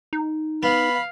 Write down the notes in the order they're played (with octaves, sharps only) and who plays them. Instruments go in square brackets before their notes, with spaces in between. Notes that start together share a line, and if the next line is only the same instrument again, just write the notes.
[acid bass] D#4
[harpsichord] B3 [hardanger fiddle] F5 [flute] B5